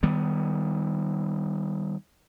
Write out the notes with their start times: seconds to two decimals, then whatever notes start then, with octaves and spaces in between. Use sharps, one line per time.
0.03 D#3 G3 B3